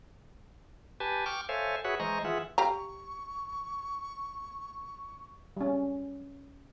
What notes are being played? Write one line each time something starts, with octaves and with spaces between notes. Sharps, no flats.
G4 B4 G#5 A5
G5 C#6 D6 F6
A4 C5 C#5 E5 F5 G#5
F#4 G#4 B4 C#5 E5 F#5
E3 G#3 C5 D#5 A#5 C#6
E3 F4 G#4 E5 F#5
G4 F5 A#5 C#6
G3 C#4